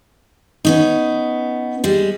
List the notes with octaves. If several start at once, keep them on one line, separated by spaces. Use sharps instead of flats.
B3 C#4 D#4
G3 G#3